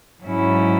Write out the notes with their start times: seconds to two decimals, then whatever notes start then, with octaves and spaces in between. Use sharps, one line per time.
0.23 G#2 F#3 C#4 E4